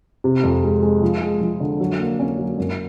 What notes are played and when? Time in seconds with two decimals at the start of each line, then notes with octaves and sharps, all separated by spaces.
0.24 C3
0.43 F2
0.63 G#3
0.83 G#3
1.02 F3
1.21 G#3
1.41 F3
1.60 D3
1.80 F#3
1.99 A#3
2.19 C#4
2.38 F#3
2.58 F#2